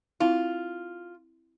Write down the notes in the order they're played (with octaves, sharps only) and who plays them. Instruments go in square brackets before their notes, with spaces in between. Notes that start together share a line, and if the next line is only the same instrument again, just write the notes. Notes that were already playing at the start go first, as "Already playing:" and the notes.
[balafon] C4 E4 [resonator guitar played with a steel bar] F4